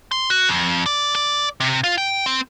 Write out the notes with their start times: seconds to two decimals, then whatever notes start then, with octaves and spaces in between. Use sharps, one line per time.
0.12 C6
0.30 F#4
0.49 F2
0.86 D5
1.15 D5
1.60 C3
1.84 F4
1.98 G5
2.26 C4